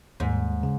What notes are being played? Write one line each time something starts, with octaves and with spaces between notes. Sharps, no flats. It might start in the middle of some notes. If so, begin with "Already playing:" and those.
D#2 G#2
C#3